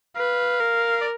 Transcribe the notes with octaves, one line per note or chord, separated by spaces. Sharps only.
B4 F5
A#4
D5